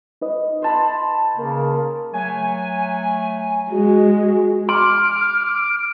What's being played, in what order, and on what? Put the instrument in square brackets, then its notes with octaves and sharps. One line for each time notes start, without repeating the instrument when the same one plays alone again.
[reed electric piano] D#4 B4 D#5
[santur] C5 A5 B5
[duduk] C#3 [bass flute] A#3
[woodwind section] F#3 A3 G#5
[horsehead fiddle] G#3 [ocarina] F#4
[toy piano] C6 [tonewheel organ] D6 [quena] F6